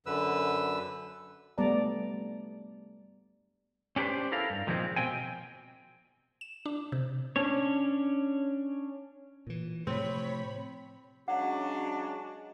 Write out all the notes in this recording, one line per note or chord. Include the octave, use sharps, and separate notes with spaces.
F#2 D3 B4 E6
G3 A3 B3 D5 A5 A#5
C#4 D4 G4 B4 C5
E4 A4 A#4 F5
G2
A#2 D#3 F3 G#3 B3 C4
B2 C4 G5 G#5
E7
D4
C3
C#4 D4 C#5
A#2 E3
A2 C3 F3 C4 C#5 B5
C#3 F#3 G#3 C#4 D4 F#4 F#5